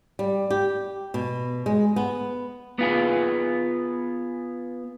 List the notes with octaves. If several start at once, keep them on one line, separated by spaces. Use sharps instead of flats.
G3
G4
B2
G#3
B3
B3 F4 G#4